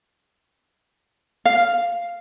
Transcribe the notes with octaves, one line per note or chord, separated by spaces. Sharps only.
F5